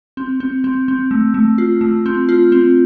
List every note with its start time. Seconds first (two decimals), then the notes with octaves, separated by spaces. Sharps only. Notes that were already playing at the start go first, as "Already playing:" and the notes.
0.17 C4
0.40 C4
0.64 C4
0.88 C4
1.11 A3
1.34 A3
1.58 F4
1.81 A3
2.06 C4
2.29 F4
2.52 C4